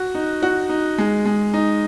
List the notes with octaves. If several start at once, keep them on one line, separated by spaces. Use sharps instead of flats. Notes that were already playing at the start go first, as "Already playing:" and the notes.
Already playing: F#4
D#4
F#4
D#4
G#3
G#3
D#4